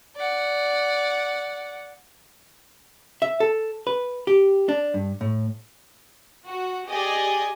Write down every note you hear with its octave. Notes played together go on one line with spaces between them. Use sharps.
D5 F#5
E5
A4
B4
G4
D4
G2
A2
F#4
G4 G#4 D5 D#5 G#6